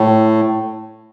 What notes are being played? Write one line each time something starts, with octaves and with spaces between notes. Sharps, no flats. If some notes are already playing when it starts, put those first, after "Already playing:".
Already playing: A2